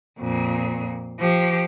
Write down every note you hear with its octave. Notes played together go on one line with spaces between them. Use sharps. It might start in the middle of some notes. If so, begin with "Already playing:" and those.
F2 A#2
F3 G4